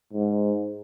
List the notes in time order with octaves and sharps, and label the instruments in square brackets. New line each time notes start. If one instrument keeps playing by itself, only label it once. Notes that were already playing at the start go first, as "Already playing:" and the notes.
[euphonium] G#2